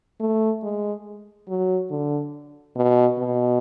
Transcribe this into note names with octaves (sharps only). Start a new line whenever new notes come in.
A3
G#3
F#3
D3
B2
B2